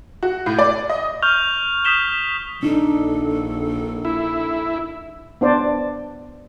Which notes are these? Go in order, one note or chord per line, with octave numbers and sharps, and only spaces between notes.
F#4
A2
D5
D#5
C#6 F6 G6 F7
D#6 G6 B6 E7 G7
A#1 D4 D#4 A4
E4
B3 D4 C5 D5